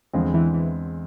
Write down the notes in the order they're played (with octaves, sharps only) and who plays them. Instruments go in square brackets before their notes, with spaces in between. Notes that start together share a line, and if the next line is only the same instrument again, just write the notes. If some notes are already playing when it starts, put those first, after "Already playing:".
[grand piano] E2 D3 G#3 C4 [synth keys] F3
[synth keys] E3
E3